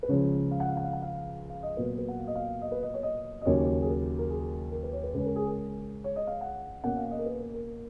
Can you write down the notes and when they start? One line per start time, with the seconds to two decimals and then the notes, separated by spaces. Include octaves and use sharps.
0.03 B4
0.08 C#2 C#3 F3 C#5
0.51 F5
0.60 F#5
0.68 F5
0.77 F#5
0.84 F5
0.93 F#5
1.02 F5
1.50 F5
1.63 D#5
1.77 A#2 F#3 B3 B4
1.98 B4
2.08 F#5
2.19 F5
2.27 D#5
2.35 F5
2.62 D#5
2.72 B4
2.83 D#5
2.94 C#5
3.03 D#5
3.42 D#5
3.45 D#2 C#3 F#3 A#3 C#4 C#5
3.66 C#5
3.82 G#4
3.88 A#4
4.19 A#4
4.30 G#4
4.72 A#4
4.83 B4
4.93 C#5
5.04 B4
5.14 C#2 C#3 G#3 C#4 B4
5.26 A#4
5.36 G#4
5.46 A#4
6.04 C#5
6.16 D#5
6.27 F5
6.41 F#5
6.83 B2 A#3 C#4 F#5
6.96 F5
7.11 D#5
7.19 A#4
7.26 B4
7.39 A#4
7.54 A#4